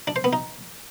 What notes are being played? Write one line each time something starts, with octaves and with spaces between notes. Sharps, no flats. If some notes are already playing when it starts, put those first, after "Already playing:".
D4
C5
B3
D#4